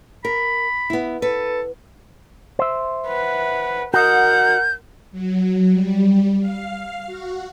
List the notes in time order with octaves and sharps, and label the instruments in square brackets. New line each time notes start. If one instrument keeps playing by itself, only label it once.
[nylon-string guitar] A#4 [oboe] B5
[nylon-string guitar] B3 E4
[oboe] A4 [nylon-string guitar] B4
[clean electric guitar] C5 E5
[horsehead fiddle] B4 F#5
[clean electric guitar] F#4 D#5 [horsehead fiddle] A#4 F#5 [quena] G6
[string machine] F#3
G3
F5
F#4